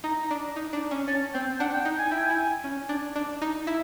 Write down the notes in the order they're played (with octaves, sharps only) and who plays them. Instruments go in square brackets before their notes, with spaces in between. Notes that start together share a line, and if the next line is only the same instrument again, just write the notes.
[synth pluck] D#4 [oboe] A#5
[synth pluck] D4
D#4
D4
C#4
[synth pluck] C#4 [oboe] A5
[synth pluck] C4 [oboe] G5
[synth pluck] D4 [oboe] F#5
[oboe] G5
[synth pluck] D#4
[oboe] G#5
[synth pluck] E4 [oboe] G5
[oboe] G#5
[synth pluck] E4
C#4
D4
D4
D#4
E4